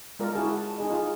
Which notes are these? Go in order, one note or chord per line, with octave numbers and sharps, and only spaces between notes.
G#3 F4 A#4 D5
E4 F#4 G#4 A5
A5
D#4 G#4 D#5
F4 G#4